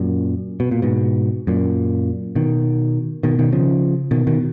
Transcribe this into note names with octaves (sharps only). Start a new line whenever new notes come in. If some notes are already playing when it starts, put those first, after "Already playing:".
Already playing: F#2 A#2
B2
A#2
G#2 B2
F#2 A#2
B2 D#3
B2 D#3
B2 D#3
C#3 F3
B2 D#3
B2 D#3